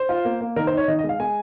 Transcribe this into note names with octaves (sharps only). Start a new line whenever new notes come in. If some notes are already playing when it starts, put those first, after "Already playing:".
Already playing: C5
F4
A#3
A#3
D#3 A#4
C5
D#4
C#5
D#3 D#5
D#5
G#3
F5
G#3 G#5